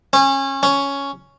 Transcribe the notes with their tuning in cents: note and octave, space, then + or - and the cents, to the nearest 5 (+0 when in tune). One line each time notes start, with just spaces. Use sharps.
C#4 -25
C#4 +5